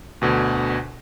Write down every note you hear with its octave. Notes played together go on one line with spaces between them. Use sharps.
D2 B2 D3